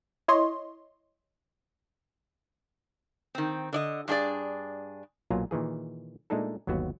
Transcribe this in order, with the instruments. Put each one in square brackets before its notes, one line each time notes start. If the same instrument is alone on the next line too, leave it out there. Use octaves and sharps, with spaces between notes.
[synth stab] E4 C#5 D#5 C6
[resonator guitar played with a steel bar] D#3 C4
D3 D5 D#5
G2 D4 G#4 D5
[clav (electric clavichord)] B1 A#2 F#3 F4 G#5 A#5
A#2 D#3 E3 G#4
A#2 G#3 A3 D4 D#4 A4
G1 D#2 F#3 B3 F#4